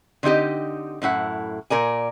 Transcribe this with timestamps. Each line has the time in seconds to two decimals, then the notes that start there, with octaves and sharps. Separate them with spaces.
0.23 D3 C4 D#4 G4 D#5
1.02 F#2 A2 E4 F#5
1.70 A#2 A#4 D5 G#5